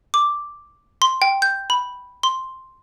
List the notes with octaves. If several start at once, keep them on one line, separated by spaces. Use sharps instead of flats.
D6
C6
G5
G6
B5
C6